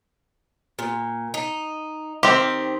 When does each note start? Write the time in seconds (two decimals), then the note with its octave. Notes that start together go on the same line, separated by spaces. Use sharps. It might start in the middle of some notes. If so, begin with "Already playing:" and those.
0.79 A#2
1.34 D#4
2.23 D#3 C4 G4